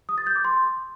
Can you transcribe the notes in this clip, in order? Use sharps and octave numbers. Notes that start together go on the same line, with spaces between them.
D#6
A6
G6
D6
C6